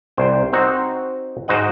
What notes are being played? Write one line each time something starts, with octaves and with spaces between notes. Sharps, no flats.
C2 C5 G5
C4 D#4 F#4 C5
G#2 F#4 C5 D#5 F#5